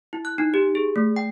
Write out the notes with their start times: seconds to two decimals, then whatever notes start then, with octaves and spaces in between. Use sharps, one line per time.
0.13 E4
0.25 F#6
0.38 D#4
0.54 G4
0.75 G#4
0.96 A3
1.16 G5